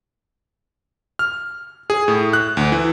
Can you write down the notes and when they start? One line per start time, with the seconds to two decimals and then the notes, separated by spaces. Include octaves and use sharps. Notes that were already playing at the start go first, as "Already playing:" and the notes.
1.19 F6
1.90 G#4
2.08 A2
2.33 F#6
2.57 D2
2.72 E3